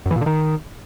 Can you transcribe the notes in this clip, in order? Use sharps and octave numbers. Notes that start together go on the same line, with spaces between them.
F#2
E3
A#2
D3
D#3